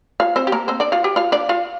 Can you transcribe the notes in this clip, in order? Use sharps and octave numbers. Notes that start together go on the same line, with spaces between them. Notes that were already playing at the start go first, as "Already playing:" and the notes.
F4 F5
C4 C5
G4
A#3 A#4
C4 C5
D4 D5
F4 F5
G4 G5
F4 F5
D4 D5
F4 F5